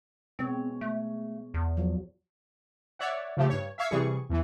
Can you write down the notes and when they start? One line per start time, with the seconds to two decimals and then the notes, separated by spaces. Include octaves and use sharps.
0.39 B2 G#3 C4 C#5
0.81 A3
1.54 E2
1.77 F3 F#3
2.99 C#5 D5 E5 F#5
3.37 C#3 F3 A3 G4
3.49 G2 C#5
3.78 E5 F5 C#6 G#6 B6
3.91 C3 E3 G3 G#4 C#6
4.30 E2 E3